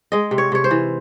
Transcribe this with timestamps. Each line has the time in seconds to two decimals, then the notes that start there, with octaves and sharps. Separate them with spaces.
0.12 G#3 D#5
0.31 C3
0.38 C#5
0.52 C3 C#5
0.64 C5
0.71 E3